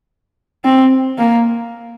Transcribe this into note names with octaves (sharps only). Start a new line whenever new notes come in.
C4
A#3